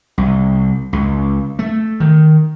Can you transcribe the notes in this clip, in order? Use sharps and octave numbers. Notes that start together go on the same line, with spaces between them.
C2
C#2
A3
D#3